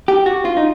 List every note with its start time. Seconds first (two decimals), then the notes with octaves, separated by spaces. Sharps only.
0.08 G4
0.26 F#4
0.45 F4
0.57 D#4